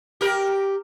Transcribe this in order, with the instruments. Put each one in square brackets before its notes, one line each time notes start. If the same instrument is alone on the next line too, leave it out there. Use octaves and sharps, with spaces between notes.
[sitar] G4 A#4